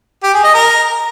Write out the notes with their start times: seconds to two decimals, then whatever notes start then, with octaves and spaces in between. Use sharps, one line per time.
0.23 G4
0.33 G#4
0.44 D#5
0.54 A#4